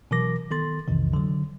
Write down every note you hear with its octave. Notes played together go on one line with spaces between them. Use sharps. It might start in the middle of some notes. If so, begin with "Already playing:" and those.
B2 E3 F#3 A#4 D6 A#6
D#3 B3 A4 C6 A6
B1 F2 C3 D#3 E3
D3 F#3